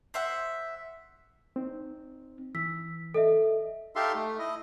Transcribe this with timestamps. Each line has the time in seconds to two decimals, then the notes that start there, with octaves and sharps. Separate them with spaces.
0.14 C5 E5 F#5
1.56 C4 D#4
2.55 E3 E6 B6
3.14 A4 D#5 E5
3.96 D#4 G4 A4 E5 F5 C6
4.15 A3
4.39 E4 D#5